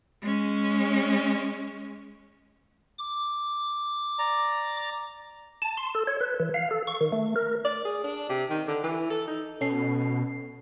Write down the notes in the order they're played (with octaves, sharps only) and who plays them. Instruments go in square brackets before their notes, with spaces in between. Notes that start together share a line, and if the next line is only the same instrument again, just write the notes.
[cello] G#3 C#4
[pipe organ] D6
[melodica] D5 A#5
[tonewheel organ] A5
C6
A4
C#5
B4
E3
F5
A4
C#6
D#3
A3
A#4
[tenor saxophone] D5
G#4
D4
C3
D#3
D3
E3
A4
D#4
[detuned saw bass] B2 [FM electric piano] C#4 A4 C7